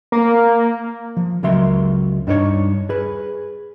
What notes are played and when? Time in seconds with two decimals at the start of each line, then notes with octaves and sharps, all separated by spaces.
0.12 A#3
1.17 F3
1.43 C#2 F#3 A#4 E5 C6
2.27 G2 D4 D#4 A#4 C#5
2.89 G#4 B4